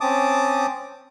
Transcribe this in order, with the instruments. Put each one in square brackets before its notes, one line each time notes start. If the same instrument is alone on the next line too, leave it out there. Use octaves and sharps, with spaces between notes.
[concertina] C4 C#4 A5 D6 D#6